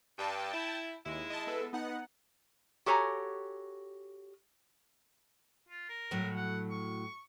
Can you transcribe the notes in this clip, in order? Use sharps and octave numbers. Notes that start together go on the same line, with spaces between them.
G2 G5 A5
E4
D#2 G#3 E4
D#5 A5
B3 A4
B3 D#4 F#5
F#4 G4 A4 C#5 G#5 A#5
F4
A#4
A2 F#3
F#5
C#6